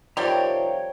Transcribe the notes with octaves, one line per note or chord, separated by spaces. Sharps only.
C3 D#3 F3 G3 C4 G4 C#5 A#5